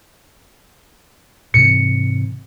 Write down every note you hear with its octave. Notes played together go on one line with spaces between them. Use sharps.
G#2 C3 E3 C#7